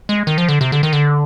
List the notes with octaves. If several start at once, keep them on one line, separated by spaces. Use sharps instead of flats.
G#3
D#3
F3
D3
C3
D3
D#3
D3